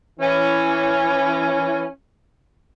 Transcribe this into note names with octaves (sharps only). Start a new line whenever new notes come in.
E3 C#4